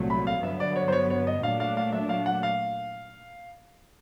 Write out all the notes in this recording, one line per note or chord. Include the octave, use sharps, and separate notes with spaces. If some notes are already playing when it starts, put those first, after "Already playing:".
Already playing: C2 A#2 F#3 A3
B5
F5
G2 D3 F#3 B3 E5
D5
C#5
C5
C#5
C#5
D#5
A#2 F#3 A3 D4 F5
F5
F5
E5
F5
F#5
F5